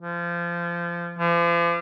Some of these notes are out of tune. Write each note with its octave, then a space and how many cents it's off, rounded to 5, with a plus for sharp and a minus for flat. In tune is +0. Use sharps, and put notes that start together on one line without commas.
F3 -25
F3 -40